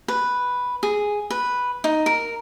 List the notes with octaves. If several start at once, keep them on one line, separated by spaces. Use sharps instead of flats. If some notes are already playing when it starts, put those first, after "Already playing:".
B4
G#4
B4
D#4
A#4